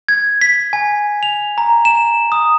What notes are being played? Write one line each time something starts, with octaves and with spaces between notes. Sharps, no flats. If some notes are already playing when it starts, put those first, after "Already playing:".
G#6
B6
G#5
F7
A#5
E7
D#6